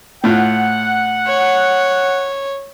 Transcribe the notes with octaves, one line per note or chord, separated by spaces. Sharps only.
A2 F4 F#5
C#5